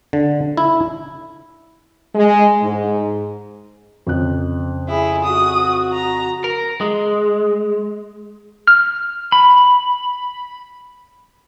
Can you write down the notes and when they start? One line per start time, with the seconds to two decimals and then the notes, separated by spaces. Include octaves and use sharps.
0.13 D3
0.57 E4
2.14 G#3
2.61 G#2
4.07 F2 C#3 F#6
4.89 E4 G#4
5.25 F#4 D#6
5.93 A#5
6.44 A#4
6.81 G#3
8.67 F6
9.32 B5